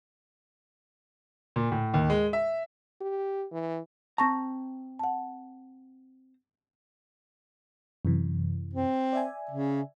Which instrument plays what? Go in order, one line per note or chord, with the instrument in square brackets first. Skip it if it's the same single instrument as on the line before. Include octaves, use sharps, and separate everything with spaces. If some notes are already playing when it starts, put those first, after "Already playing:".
[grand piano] A#2
A2
D#2
G#3
E5
[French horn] G4
E3
[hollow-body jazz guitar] C4 A#5 [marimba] A5 C#6 A#6
[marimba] F#5 A5
[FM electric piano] F#2 C3 E3
[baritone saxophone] C4
[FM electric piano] D5 E5 G#5
[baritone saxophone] C#3